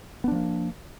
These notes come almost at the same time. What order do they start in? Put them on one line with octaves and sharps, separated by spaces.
B3 D4 F3 A#3